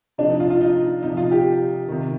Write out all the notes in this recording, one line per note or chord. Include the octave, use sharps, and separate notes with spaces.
C3 F3 D4
D#4
F4
F4
D#4
C3 F3 D#4
F4
G4
C3 D#3